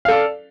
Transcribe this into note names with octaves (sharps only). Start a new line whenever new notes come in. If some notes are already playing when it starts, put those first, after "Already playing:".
A4 D5 F5